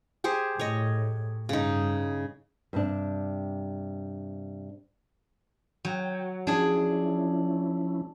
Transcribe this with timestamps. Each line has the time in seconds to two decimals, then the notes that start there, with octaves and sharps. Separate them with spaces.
0.24 G4 G#4 C5
0.59 A2 C#5 D#5
1.49 G2 C#3 D#4
2.73 G2 C3 D4
5.85 F#3 G5
6.47 F3 C#4 D4 E4 G#4